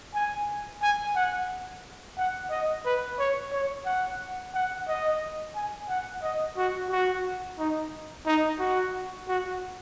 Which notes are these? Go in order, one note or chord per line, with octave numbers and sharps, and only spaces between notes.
G#5
G#5
F#5
F#5
D#5
B4
C#5
C#5
F#5
F#5
D#5
G#5
F#5
D#5
F#4
F#4
D#4
D#4
F#4
F#4